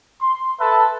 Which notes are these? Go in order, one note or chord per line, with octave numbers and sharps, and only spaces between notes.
C6
A4 B4 E5 A5